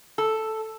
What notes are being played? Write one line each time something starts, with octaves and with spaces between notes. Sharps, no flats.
A4